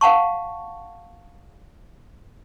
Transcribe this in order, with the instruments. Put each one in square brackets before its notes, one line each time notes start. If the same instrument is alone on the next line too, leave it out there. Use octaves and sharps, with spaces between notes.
[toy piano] F5 F#5 A5 C#6